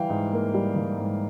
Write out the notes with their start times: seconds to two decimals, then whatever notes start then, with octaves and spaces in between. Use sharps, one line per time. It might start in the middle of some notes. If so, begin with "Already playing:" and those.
Already playing: E3 G3 F5 G5
0.10 G#2
0.32 A#3
0.54 G3
0.76 E3
0.99 G#2